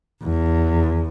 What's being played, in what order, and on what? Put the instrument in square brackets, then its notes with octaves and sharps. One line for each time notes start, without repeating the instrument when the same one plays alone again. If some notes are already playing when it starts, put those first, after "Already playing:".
[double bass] E2